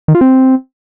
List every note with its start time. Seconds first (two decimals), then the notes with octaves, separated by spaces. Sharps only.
0.08 D#3
0.15 F4
0.21 C4